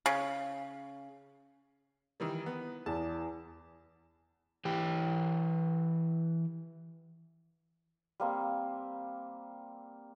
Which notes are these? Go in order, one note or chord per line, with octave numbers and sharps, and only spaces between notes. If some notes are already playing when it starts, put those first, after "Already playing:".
C#3
D#3 E3 G3
B3
E2 A5
E3 G4
G3 A#3 C4